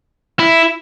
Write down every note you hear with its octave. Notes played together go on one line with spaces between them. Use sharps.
E4